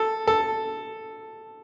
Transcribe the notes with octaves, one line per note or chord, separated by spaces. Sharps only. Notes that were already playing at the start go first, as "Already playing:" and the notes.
Already playing: A4
A4